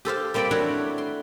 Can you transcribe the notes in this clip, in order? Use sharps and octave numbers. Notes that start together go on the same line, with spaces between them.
G4 A4 C5 F5
G3 A#3 C4 D5 G5 B5
A3 D4 E4 F#4 C#5 F#5
C6